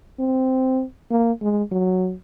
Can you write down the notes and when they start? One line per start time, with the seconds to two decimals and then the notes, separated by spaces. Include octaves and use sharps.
0.20 C4
1.11 A#3
1.41 G#3
1.71 F#3